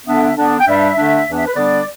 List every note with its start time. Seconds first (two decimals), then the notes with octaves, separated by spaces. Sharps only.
0.06 D3 B3 D4 E5
0.36 D3 B3 D4
0.60 G5
0.66 G2 G3 D4 E5
0.96 D3 A3 D4
1.27 E2 E3 B3 D4
1.37 E5
1.46 B4
1.56 D3 G3 B3 D4 D5